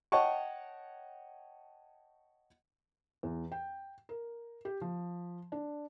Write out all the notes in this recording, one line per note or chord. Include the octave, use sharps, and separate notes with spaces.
C#5 D#5 F#5 G5 A5 C#6
E2
G5
A#4
G4
F3
D4